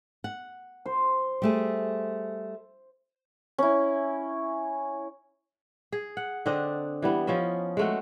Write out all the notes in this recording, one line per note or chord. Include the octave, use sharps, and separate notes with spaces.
F#5
C5
G3 A3 G#4
C#4 E4
G#4
F#5
D3 C4 D4 D#5
E3 G3 B3
F3 C#4 D#5 E5
G#3 A3 F#4